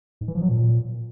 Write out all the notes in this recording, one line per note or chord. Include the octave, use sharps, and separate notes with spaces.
G#2
E3
F3
F#3
A#2